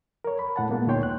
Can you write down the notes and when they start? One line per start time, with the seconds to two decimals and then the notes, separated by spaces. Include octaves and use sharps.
0.24 A#4 C#5
0.39 B5
0.56 A2 F#5 A5
0.69 A#2 G#3 A#3 B3
0.87 D2 A#2 D#4 C#5 G5 C6
1.03 F#6